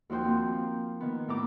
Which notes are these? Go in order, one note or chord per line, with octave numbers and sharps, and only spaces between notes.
D#2 F3 F#4 C5 G5
F3 A#3 C4
D#3 B3
A2 A4 A#5 D6